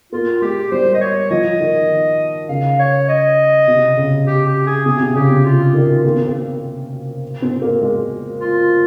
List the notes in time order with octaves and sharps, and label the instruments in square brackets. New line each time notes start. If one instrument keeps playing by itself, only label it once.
[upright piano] A#3 [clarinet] F4
[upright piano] G#3 [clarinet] G4
[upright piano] G3 [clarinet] C5
[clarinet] D#5
C#5
[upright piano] F3 [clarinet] D#5
[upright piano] D#3
[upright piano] C#3 [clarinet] F5
[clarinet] C#5
D#5
[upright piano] C3
C#3
[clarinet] G4
G4
G#4
[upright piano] C3 [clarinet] G#4
[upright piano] C3
[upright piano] C#3 [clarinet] G4
[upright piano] C3
[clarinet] F4
[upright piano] D#3
A#3
C4
A#3
C4
A#3
G#3
[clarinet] F4